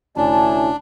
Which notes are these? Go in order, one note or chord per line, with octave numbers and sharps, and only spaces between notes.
F1 D2 C#4 D4 E4 D5 G#5 A5